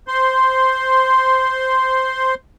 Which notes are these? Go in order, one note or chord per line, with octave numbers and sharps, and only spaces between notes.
C5 C6